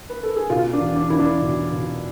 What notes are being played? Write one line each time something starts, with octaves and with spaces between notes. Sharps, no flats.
B4
A4
G#4
B2 F4
D4
E2
D4
E2 E4
D4
B2
B2